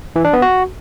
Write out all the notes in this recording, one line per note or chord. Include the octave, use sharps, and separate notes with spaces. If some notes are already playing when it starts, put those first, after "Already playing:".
E3
D4
B3
F#4